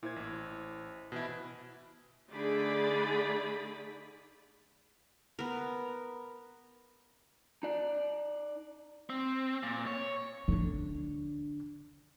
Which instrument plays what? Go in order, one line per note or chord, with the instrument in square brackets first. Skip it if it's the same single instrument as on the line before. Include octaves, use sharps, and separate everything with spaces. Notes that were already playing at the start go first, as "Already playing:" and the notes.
[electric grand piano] A#2 G#6 [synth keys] E4 C5
[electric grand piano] A1
[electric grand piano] B2 E3 E4 [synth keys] F#6
[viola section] D3 A3 D#4 G#4 D5 B5
[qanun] B3 A#4
[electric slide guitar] D#4 D5
[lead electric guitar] C4
A#2
C#5
[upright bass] D3 D4